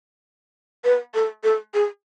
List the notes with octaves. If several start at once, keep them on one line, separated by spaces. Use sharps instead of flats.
B4
A4
A4
G#4